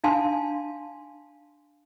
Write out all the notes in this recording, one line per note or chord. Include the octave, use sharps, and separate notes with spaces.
D4 F5 G#5 A5 C6